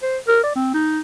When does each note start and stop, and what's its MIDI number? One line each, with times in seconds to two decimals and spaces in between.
0.03 0.18 72
0.28 0.42 70
0.44 0.53 74
0.56 0.70 60
0.74 1.01 63